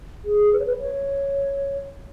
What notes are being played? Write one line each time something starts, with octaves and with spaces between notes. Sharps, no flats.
G#4
B4
C#5
B4
C#5